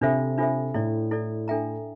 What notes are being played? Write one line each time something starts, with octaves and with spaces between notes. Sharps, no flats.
C3 D4 F4 A4 C5 E5
D4 F4 A4 C5 E5
A2 E4 A4 D5
E4 A4 D5
D4 A4 E5 G5 A#5